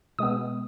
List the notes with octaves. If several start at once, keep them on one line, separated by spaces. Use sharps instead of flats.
B2 G#3 B3 D#6